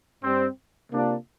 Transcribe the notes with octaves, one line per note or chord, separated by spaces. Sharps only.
G2 G3 C4
C3 A#3 D4 F4